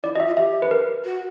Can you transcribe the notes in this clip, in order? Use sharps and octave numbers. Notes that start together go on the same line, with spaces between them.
E4 D5
F#4 D#5
E5
F4
G4 E5
B4
A#4
F#4